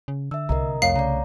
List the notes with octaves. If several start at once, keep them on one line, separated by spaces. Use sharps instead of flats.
C#3
D3 E5 E6
C2 A#4 D#5 A#5
F2 A3 C#5 F5 C7
C#3 D5 A#5